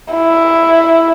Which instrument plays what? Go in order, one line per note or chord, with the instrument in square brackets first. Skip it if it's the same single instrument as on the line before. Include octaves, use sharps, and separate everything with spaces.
[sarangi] E4